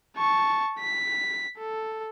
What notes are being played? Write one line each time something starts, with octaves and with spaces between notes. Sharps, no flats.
A5 C#6
B6
A4